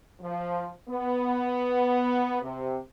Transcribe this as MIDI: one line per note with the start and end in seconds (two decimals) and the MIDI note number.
0.20 0.69 53
0.89 2.37 59
2.41 2.78 48